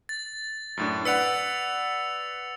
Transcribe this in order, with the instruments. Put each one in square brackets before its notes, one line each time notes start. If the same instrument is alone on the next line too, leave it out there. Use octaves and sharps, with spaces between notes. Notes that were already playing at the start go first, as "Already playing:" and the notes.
[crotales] A6
[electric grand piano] F#2 A2 D4
[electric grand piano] B4 D5 F#5 [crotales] E6 C#7 F7